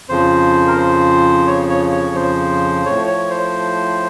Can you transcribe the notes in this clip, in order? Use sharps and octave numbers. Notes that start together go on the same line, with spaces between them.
F2 C#3 F3 C5
A#4
C5
C#5
C#5
C#5
C5
A2 F3 C#5
C#5
C5